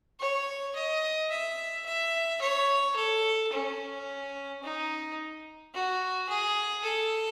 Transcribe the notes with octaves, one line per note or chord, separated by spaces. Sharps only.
C#5
D#5
E5
E5
C#5
A4
C#4
D#4
F#4
G#4
A4